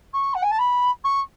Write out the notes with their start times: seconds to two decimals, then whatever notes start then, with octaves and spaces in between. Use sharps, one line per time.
0.13 C#6
0.34 F#5
0.42 G#5
0.50 A5
0.58 B5
1.04 C#6